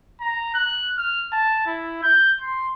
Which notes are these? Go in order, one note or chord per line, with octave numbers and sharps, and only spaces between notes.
A#5
F#6
F6
A5
E4
G6
C6